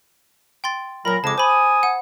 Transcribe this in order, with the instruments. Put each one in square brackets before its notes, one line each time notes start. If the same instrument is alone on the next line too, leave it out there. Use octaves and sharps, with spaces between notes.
[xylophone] G5 C6 A6
[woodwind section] A#2 F#3 A#4 [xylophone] B5 A#6
[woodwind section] F2 C#3 G#3 [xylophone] A5 D6
[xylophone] C5 B5 [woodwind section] G#5 D#6
[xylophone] F#5